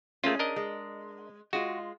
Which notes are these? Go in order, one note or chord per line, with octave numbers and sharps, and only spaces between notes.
A3 A#3 C#4 F4 G#4
D4 A#4 D#5
G#3
G#3 F4 F#4